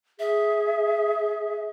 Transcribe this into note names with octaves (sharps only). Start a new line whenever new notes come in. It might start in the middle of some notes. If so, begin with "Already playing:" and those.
G#4 E5